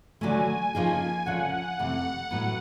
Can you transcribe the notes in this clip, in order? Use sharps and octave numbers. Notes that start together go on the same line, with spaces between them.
D3 F#3 A3 G#5
C#3 F3 A#3 D#4 G#4
D2 C#3 F3 F#5
F2 C3 E3 A3
A2 F#3 B3